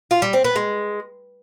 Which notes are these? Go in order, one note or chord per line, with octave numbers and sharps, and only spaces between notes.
F4
G3
C4
B3
G#3